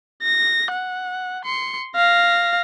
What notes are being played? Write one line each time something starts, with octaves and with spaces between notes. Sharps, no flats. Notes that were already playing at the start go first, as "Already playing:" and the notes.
A#6
F#5
C6 C#7
F5 A#6